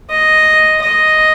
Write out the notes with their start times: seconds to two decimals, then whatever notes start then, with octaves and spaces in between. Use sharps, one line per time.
0.10 D#5
0.82 D#5